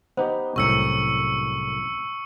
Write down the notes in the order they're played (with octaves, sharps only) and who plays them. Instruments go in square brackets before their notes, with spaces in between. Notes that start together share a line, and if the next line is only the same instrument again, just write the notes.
[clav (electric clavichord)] B3 D#4 G4 [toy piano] C5
[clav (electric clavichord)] C2 F#2 A2 [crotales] C#6 E6 C#7